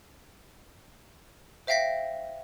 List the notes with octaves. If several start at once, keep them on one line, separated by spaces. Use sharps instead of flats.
C5 E5 F5 G5 A#6 B6